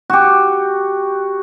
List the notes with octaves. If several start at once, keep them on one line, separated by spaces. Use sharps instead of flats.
F#4 G4